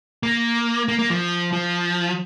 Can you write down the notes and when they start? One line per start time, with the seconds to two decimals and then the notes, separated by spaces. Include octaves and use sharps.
0.23 A#3
0.88 A#3
0.99 A#3
1.10 F3
1.53 F3